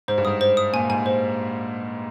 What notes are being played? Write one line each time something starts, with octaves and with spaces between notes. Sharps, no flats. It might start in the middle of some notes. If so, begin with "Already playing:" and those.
G#2 C5
G2
G#2 D#6
C5
D#6
A#2 G#5
G#2 G#5
C5